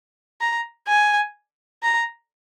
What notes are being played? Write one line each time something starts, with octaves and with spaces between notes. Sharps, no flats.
A#5
G#5
A#5